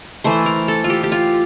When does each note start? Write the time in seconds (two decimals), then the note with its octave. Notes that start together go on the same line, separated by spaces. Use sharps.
0.24 E3 A3 C5
0.46 A#4
0.68 A4
0.84 F4
0.90 G4
1.03 G4
1.12 F4